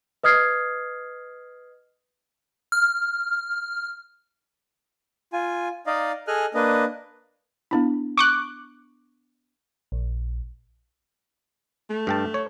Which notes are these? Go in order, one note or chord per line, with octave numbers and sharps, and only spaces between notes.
B4 D#5 D#6 F6 G#6 C7
F6
F4 G#5
D#4 D5 D#5 F5
G#4 A4 D#5 G#5 F6 F#6
A#3 D4 B4 D#5
B3 D4 E4
C#6 D6 F#6
A#1
A3
G2 G5 A5
C#5